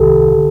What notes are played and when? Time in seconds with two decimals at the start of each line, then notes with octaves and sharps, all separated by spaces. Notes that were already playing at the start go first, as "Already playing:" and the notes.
Already playing: C2 C3 D#3 G4 A4
0.35 D3